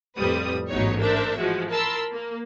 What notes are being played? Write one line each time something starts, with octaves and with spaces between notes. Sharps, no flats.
F2 A2 G3 B4 D#6
A1 G#2 F#3 B3 D#4 C#5
D4 A#4 C5 E5
E3 F3 G#3 F#4
A#4 A5 B5 C6 E6
A#3